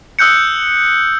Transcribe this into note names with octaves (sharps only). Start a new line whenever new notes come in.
D#6 E6 F#6 G6 C#7